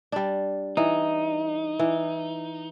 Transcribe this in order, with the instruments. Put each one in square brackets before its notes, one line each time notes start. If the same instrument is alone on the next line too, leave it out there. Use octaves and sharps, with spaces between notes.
[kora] G3 D4
[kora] E3 [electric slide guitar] D#4
[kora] E3